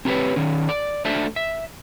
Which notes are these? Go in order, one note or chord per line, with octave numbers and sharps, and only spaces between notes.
C4 G4 G#4 B4 C#5
D#3 C#4
D5
A3 D4 C5 E5
E5